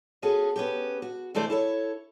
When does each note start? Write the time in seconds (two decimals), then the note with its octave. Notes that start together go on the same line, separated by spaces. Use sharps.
0.22 B3 C#4 F#4 G#4 A4
0.56 B3 C#4 G4
1.02 F#4
1.35 C3 E3 A3 C5 D5
1.50 E4 A4 C#5